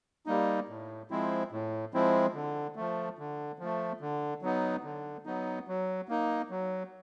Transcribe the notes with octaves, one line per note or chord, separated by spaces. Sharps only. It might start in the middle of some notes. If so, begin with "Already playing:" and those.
G3 A#3 D#4
A2
F3 G#3 C4 E4
A2
F3 G#3 C4 E4
D3
F3 A3
D3
F3 A3
D3
F#3 B3 D#4
D3
F#3 B3 D#4
F#3
A#3 D#4
F#3